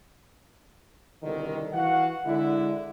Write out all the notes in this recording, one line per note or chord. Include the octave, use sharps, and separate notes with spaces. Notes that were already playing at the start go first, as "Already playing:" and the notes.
C2 B2 D3 D#3
E3 F#4 F5 F#5
D3 G#3 E4